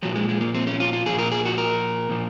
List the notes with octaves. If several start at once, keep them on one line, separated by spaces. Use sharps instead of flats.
A#2 F3 F#3
G#3
G#3
A#3
C4
C#4
F4
F4
A#2 F3 G#4
A#4
G#4
F#4
A#4
A#2 F3